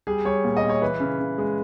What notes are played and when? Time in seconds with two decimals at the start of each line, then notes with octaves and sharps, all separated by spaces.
0.07 G3 G#4
0.25 G3 C#5
0.44 A#2
0.57 D#5
0.63 A#2
0.69 C#5
0.82 E3 B4
1.00 C#3
1.19 C#3
1.38 G#3